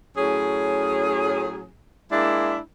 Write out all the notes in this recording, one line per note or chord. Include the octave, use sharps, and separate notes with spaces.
A2 F#3 C#4 G#4
G#3 A#3 D4 E4